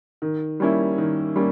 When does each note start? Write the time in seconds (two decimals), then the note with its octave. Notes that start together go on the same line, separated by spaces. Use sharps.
0.22 D#3
0.60 G3 A#3 C#4 E4
0.98 D#3
1.36 G3 A#3 C#4